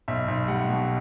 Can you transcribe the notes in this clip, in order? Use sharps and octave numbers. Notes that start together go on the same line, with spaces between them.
B1 E5
B1
G3 F#5
B2